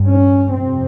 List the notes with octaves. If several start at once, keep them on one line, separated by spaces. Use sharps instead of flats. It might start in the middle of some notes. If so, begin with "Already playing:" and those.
Already playing: G2
C#4
F2 C3 C4